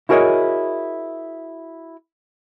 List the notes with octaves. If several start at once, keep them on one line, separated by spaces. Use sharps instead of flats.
E4 F#4 G#4 A#4 C#5 D#5